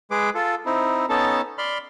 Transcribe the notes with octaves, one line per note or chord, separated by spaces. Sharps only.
G#3 G#4 B4 D6
F4 A4
C4 D#4 E4
B3 C#4 D#4 A4 A5
D5 B5 C6 F6